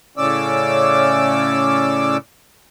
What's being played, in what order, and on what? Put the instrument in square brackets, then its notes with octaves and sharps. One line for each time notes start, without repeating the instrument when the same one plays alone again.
[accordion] A2 C#3 C#4 D5 D6 E6